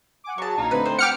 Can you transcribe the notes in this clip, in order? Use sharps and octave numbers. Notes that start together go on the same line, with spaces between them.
F#5 G#5 D6
F#3 F#4 G#4 A5 C#6
A#1 D#4 F5 G#6
D3 A3 C4 B4
C5
G4 F#5 D6 F6 C#7